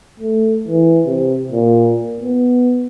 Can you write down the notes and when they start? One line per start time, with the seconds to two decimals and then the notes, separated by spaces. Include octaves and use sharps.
0.20 A3
0.68 E3
1.07 C3
1.52 A#2
2.21 B3